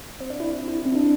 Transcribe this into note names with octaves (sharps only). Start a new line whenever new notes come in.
C4
D4
E4
E4
C4
D4